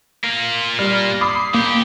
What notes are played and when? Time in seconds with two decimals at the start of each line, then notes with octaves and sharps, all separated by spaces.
0.24 A#3 F4
0.79 G3 F6
1.21 B5 D6 D#6 C7
1.54 A#2 A#3 G4